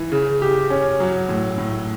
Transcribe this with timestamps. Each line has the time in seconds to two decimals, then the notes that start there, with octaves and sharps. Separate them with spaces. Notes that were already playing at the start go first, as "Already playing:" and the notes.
Already playing: E3
0.12 C#3
0.42 G4
0.70 C#4
1.00 F#3
1.29 A2
1.58 A2